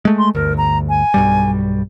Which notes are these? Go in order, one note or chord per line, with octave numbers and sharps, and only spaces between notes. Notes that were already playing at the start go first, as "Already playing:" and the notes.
G#3 A3
C6
G1 D2 A#4
A#5
G#5
B1 G2 G3